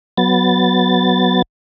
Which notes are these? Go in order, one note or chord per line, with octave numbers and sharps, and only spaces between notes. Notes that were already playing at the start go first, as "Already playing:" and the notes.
F#3 B3 A6